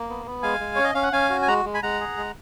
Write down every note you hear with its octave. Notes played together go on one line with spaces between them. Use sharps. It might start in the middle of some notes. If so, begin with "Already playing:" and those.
Already playing: A#3
B3
B3
G#3 F5 G#5
G#3
C#4 C#5
D#5
C#4 F5
F#5
C#4 F5 G#5
F#4
G#5
G#3 F#5 A#5
G#3
G#5 B5
G#3 F#5 A#5
G#4
G#3